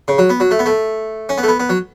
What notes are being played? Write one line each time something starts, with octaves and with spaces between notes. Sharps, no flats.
C#3
F#3
B3
F#3
A3
B3
A3
C#4
B3
A3
B3
B3
F#3